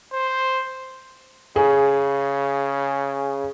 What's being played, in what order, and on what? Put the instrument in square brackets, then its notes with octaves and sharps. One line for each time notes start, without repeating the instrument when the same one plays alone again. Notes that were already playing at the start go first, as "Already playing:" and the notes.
[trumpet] C5
[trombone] C#3 [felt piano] G#4